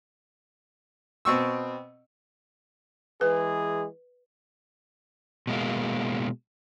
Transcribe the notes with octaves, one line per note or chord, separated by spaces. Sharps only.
B2 C4 C#6 E6
E3 G#3 G#4 B4
B2 G#3 A#3